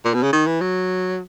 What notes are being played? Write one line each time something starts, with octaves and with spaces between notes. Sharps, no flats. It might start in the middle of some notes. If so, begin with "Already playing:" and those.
A#2
B2
C#3
D#3
E3
F#3